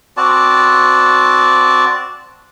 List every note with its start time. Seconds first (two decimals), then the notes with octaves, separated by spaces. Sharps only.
0.17 C4 F#4 D5 A5